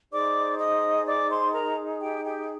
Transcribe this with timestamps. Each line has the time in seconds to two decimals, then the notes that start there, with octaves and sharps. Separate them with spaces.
0.12 D#4 G#4 C5 D5 D6
0.59 D#5 D#6
1.06 D5 D6
1.29 C5 C6
1.53 A#4 A#5
2.01 G4 G5
2.25 G4 G5